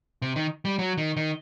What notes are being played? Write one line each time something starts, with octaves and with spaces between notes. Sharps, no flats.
C3
D#3
G3
F#3
D#3
D#3